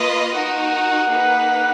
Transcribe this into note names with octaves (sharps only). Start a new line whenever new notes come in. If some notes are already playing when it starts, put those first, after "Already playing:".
Already playing: A#3 F4 B4 D#5
D#4 F#4 A#4 F#5
A#3 D#4 G#4 B4